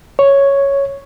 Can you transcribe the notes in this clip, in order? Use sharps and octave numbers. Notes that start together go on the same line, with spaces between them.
C#5